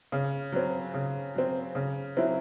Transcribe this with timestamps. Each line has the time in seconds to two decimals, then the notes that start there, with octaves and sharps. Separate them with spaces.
0.12 C#3
0.52 F#3 C4
0.94 C#3
1.35 F#3 C4
1.75 C#3
2.17 F#3 C4 E4